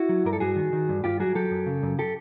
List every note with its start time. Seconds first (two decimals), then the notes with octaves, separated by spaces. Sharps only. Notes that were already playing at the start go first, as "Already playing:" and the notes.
Already playing: E4 F#4
0.09 F#3
0.25 G2 A#4
0.33 A4
0.40 G2 F#4 G#4
0.56 D#3
0.73 D#3
0.89 G2
1.04 G2 F4 G4
1.19 F#3 F#4 G#4
1.35 F#3 G4 A4
1.51 F#2
1.66 C#3
1.83 F#2
1.99 G4 A4